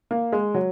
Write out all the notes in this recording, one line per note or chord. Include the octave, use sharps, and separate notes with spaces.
A#3
G#3
F#3